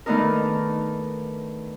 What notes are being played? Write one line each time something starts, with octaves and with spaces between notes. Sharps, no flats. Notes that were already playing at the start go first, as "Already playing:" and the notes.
D#3 A3 B3 D4 D#4 A#4